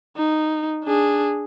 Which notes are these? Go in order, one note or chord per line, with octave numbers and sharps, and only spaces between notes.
D#4
D4 G#4